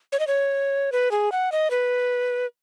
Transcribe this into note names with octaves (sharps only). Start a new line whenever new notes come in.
C#5
D#5
C#5
B4
G#4
F#5
D#5
B4